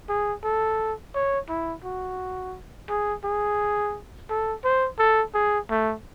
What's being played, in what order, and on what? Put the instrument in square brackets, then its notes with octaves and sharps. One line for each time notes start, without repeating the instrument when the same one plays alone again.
[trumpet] G#4
A4
C#5
E4
F#4
G#4
G#4
A4
C5
A4
G#4
A3